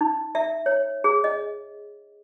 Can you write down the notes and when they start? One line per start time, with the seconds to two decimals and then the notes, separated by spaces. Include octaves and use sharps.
0.01 D#4
0.35 E5
0.66 C#5
1.04 G#4
1.24 D#5